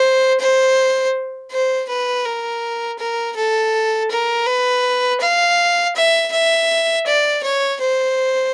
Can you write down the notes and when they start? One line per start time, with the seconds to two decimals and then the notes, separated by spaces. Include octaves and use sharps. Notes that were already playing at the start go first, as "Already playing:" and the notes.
Already playing: C5
0.40 C5
1.51 C5
1.88 B4
2.25 A#4
2.98 A#4
3.36 A4
4.10 A#4
4.47 B4
5.20 F5
5.95 E5
6.32 E5
7.06 D5
7.43 C#5
7.80 C5